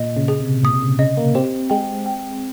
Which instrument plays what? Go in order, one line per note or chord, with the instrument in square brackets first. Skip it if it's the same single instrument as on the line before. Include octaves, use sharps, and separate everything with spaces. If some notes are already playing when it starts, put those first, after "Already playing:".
Already playing: [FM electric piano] A#2 [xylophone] D#5
[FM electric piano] C#3
[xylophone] G#4
[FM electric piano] C3
[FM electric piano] A#2 [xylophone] D#6
[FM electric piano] C3
C#3
[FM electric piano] C#3 [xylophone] D#5
[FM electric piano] A#3
[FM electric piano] C4 [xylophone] G4
[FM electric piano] G#3 [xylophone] G5
[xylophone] G5